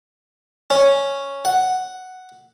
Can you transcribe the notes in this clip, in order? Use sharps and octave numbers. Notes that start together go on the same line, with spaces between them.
C#4
F#5